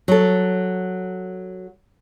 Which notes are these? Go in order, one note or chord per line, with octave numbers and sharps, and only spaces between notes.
F#3 A4